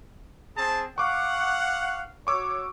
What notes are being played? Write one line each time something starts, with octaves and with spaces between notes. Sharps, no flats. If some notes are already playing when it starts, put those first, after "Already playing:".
C4 G#4 A5
F5 F#5 C#6 D6
F#4 C#5 C#6 D6 E6